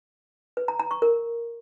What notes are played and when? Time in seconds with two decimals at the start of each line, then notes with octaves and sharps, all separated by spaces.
0.57 B4
0.68 A#5
0.80 A#5
0.91 C#6
1.02 A#4